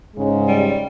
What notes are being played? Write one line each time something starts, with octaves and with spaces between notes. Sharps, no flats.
G#2 C#3 G#3
G3